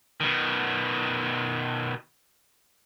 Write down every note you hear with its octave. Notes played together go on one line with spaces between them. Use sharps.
B2 D#3